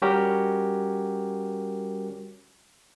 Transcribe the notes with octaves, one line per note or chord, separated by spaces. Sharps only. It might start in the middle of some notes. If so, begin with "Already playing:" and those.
G3 C#4 F#4 G4 A#4